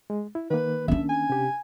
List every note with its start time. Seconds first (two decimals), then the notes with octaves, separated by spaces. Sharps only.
0.10 G#3
0.35 E4
0.51 D#3 A#3 B4
0.88 C#4 D4 E5
1.09 G#5
1.30 C3 G4